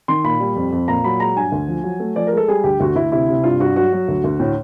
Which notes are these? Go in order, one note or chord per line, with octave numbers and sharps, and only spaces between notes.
D#3 C6
A#2 B5
G3
F2
F2
A#2 A#5
F#3 B5
G#3 A#5
G2 G#5
D2
F3
F#3
A3
F3 D5
A#4
G#3 A4
G3 G#4
D2 G4
D2 F#4
D2 E4
C3 E4
C3
G2 F4
G2 F#4
F#3 F#4
F#3
D2
D2
A2